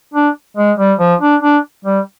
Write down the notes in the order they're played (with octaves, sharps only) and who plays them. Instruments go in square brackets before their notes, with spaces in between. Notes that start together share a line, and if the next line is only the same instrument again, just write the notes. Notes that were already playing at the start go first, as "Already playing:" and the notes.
[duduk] D4
G#3
G3
F3
D4
D4
G3